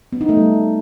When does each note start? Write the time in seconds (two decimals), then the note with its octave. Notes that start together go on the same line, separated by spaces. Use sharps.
0.13 B3
0.21 D#4
0.29 A3
0.37 G3